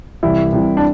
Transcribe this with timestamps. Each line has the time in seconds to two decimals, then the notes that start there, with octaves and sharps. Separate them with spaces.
0.23 C2 C3 E3 E4
0.52 C2 C3 E3
0.77 D4